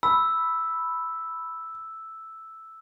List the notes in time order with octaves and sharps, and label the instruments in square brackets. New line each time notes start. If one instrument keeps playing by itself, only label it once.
[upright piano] B5 [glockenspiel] E6